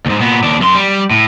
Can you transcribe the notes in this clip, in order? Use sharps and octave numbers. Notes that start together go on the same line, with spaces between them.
D2 G#2
A#2 B3
D#2 D4
F#2 C6
G3
A2